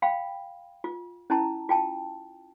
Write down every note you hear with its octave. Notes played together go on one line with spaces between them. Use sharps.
F5 G5 B5
F4
C#4 E4 A5 A#5
F4 G5 A5